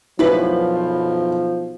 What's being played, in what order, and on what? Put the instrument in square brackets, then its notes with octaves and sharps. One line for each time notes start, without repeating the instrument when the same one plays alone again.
[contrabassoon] B1 [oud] F#2 B4 [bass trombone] F3 [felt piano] E4